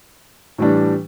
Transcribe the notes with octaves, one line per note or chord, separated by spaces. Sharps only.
A2 E3 G3 D4